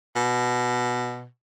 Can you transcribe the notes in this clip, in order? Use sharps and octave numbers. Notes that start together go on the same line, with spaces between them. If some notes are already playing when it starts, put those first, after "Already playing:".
B2